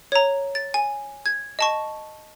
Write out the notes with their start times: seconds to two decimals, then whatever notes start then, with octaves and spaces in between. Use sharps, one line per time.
0.12 C#5 A#5
0.55 A6
0.74 G#5
1.26 G#6
1.59 D#5 A5 C#6